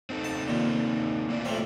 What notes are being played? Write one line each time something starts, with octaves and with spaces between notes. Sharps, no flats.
C4 D#4 A4
A5
D#2 A#2
A#3 E4 D5
A2 F3 C4